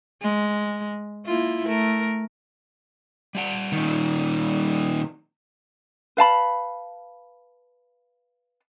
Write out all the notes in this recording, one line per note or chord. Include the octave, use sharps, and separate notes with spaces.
G#3
A#3 E4 F4
A3 A#4
G3 F4 F#5
A#2 D#3
B4 F5 A5 B5